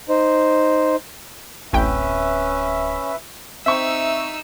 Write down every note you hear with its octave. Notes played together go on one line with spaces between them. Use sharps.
D#4 C5
D1 A1 F#3 C#4 B4 E5 G5
C4 D#4 E5 C#6 E6